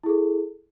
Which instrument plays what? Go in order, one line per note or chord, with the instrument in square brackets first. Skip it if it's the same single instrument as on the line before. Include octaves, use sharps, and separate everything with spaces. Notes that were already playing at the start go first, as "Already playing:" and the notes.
[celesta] E4
G#4
A4